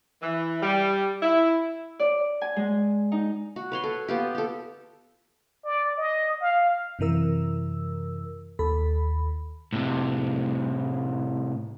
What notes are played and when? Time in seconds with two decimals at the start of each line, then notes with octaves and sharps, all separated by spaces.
0.22 E3
0.62 G3
1.22 E4
1.99 D5
2.41 G#5
2.56 G#3
3.12 D#4
3.56 F#4
3.72 B4 C#5 C6
3.84 A4
4.08 B3 F4 G4
4.35 G4 A4
5.65 D5
5.97 D#5
6.41 F5
6.99 F#2 C3 E3 A#4 E6
8.59 D#2 A4 B5
9.73 A2 C3